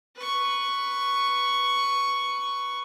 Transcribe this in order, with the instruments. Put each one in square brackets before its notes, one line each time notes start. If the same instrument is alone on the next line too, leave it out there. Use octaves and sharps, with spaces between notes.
[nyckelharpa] B4 C#6